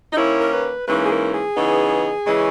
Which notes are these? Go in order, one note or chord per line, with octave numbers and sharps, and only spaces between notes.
D#4
D#3 A#3 C#4 E4
A#4
B4
G#2 E3 A#3 C#4 B4
G#4
A#4
G#4
C#3 E3 B3 D#4
C#3 E3 G#3 C#4